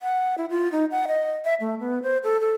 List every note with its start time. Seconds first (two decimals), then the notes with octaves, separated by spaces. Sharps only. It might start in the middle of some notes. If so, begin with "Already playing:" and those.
0.01 F#5
0.38 E4
0.50 F4
0.72 D#4
0.91 F#5
1.08 D#5
1.45 E5
1.60 A3
1.80 B3
2.03 C5
2.24 A4
2.41 A4